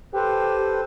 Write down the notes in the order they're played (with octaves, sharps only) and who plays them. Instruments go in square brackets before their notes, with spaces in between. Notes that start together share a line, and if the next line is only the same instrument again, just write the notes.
[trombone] G4 [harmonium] A4 B4 C5